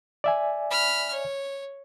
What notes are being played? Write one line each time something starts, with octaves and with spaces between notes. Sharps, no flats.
D5 E5 G#5
B5 F6
C#5